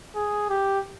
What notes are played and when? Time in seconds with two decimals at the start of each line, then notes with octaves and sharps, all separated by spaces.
0.15 G#4
0.50 G4